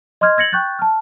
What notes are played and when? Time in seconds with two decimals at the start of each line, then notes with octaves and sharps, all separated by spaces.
0.21 D#5 C6 D6 F6 G#6
0.37 E6 G#6 A#6 C#7 F#7
0.52 G5 C#6 F#6 G6 A6
0.79 A5 F6